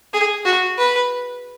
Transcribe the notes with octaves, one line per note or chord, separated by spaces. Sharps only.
G#4
F#4
B4